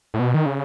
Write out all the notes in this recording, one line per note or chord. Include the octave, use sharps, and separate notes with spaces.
A2
B2
D#3
C#3